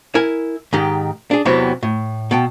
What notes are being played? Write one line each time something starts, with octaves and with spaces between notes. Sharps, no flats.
E4 A#4 G#5
G#2 D#3 G4
D4 G#4
E2 C3 E3 F#3 B3 C4
A2
B2 G5 A5